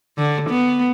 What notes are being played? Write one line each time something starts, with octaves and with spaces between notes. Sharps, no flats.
D3
B3